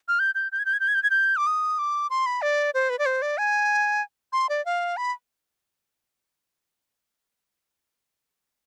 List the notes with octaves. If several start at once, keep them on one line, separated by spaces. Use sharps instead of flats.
F6
G6
G6
G6
G#6
G6
G#6
G6
G#6
G6
G#6
G6
D6
D#6
D6
C6
B5
D5
C5
B4
D5
C5
D5
G#5
C6
D5
F5
B5